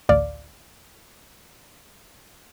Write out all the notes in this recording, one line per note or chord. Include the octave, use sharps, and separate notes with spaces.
A1 D2 D5 F5